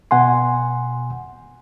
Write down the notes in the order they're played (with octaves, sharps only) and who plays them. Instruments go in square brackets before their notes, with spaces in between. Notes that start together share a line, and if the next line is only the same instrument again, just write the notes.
[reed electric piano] B2 F#5 G#5 C6